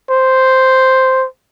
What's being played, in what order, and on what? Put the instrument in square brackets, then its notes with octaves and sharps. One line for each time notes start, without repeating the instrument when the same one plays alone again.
[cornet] C5